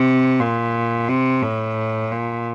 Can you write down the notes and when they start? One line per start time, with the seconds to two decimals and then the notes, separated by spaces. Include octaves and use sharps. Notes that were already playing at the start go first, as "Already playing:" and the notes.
Already playing: C3
0.40 A#2
1.08 C3
1.42 A2
2.11 A#2